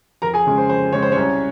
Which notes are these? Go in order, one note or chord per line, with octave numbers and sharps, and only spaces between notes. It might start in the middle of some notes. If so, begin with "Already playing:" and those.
F2 A#4 A#5
G#4 G#5
C#3 G#3 C#4
C5
F2 C5
C#3 G#3 C#4 C#5
C5
C2 C#4 C#5